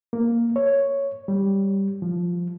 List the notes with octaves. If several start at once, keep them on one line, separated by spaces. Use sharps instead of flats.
A#3
C#5
G3
F3